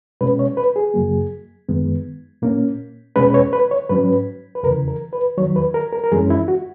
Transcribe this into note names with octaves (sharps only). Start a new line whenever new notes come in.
B2 G#3 C#4 B4
C#5
B4
G#4
F#2 C#3 F#3 A#3
F#2 D#3 G#3 B3
A#2 A#3 C#4
E2 B2 G#3 C#4 B4
B4
C#5
B4
C#5
G#2 F#3 C#4 B4
B4
E2 C#3 E3 A#4
A#4
B4
E2 D#3 F#3 C#5
B4
A#4
A#4
A#4
F#2 E3 G#3 C#4 G#4
E4
F#4